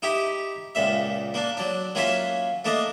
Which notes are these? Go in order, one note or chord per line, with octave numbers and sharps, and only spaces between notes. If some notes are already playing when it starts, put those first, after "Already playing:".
D#4 E4 G4
C#2 A#2 E5
A#3 D4
F#3 D4
F#3 A#3 C#4 F4 E5
A3 A#3 D4 D#5